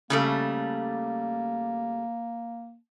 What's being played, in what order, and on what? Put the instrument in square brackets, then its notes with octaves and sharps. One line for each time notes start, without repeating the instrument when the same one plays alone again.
[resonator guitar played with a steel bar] C#3 G3 A3 [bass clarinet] A#3